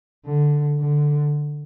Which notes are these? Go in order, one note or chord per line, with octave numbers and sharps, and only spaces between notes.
D3
D3